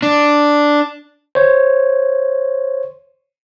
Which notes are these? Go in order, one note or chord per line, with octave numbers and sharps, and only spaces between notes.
D4
C5 C#5